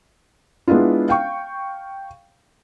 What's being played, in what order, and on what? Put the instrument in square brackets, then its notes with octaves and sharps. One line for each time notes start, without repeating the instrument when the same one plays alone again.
[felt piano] G#3 B3 D4 E4 F4
F5 G5 C#6